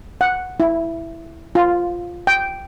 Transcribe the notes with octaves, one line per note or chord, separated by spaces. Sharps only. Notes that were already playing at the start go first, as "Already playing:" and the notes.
F#5
E4
F4
G5